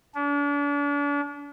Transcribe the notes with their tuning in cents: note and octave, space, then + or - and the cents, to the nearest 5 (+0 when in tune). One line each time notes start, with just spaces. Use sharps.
D4 -40